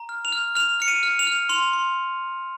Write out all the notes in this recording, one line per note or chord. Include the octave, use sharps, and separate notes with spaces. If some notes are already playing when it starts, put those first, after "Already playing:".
Already playing: A#5
F6
F7
F6
F6 F7
F6 C#7
D#7
F6
F7
F6
C6 F7
C6